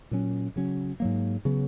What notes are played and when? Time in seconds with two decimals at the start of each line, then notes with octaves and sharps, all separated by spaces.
0.11 A#2 F#3 C#4
0.56 C#3 F#3 C#4
1.00 G#2 F#3 A#3
1.45 C#3 F#3 B3